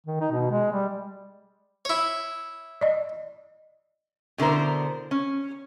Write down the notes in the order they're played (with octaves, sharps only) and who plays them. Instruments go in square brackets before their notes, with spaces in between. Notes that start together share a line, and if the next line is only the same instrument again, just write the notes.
[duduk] D#3
D#4
B2
G#3
G3
[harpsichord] E4 C#5
[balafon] D5 D#5
[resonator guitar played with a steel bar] B2 D3 E4 A#4 C5
C#4